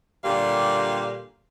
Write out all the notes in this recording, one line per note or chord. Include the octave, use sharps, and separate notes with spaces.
A#2 D3 G3 G4 F5